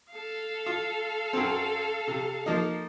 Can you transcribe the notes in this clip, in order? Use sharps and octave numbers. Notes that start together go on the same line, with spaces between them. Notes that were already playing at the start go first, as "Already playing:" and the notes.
A4 F5
F4
F#2 C4
C3
F3 A#3 D#4